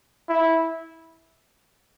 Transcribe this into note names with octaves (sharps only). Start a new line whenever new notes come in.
E4